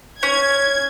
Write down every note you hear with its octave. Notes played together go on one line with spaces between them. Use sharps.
C#4 G#6